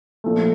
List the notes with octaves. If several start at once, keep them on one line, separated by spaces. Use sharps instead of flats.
A#2 F3 A3